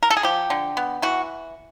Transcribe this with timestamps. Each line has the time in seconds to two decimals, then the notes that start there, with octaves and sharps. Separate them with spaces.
0.03 A#4
0.10 A4
0.17 G#4
0.23 F3 G4
0.50 D3
0.77 B3
1.02 E3 F#4